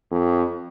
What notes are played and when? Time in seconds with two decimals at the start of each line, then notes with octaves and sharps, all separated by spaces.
0.11 F2